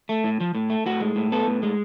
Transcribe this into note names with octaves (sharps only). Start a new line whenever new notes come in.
A3
A2
F3
A2
A3
A2 F#4
G#3
A2
B3 A4
A2
G#3